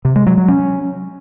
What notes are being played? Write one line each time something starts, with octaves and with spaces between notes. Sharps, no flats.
C3
G#3
F#3
F#3
C#4